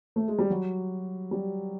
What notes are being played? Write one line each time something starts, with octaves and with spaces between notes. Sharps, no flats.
A3
G#3
G3
F#3
G3